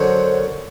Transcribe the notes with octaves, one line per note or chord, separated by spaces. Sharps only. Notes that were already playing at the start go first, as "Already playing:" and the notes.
Already playing: F#2 D3 F#3 C5